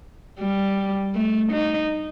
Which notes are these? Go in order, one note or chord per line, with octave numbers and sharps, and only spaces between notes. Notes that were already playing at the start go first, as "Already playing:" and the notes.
G3
A3
D#4